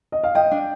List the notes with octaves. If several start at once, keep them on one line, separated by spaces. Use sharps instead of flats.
D#5
F5
D#5 G5
D4